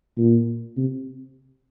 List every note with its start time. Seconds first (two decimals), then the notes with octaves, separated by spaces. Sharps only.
0.17 A#2
0.77 C3